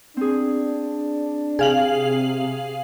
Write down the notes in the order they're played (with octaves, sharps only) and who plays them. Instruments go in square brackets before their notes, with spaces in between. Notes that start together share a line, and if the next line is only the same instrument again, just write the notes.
[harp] C4 G#4 [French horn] D4
[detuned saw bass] C3 [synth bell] G#4 F5 F#7 [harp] G5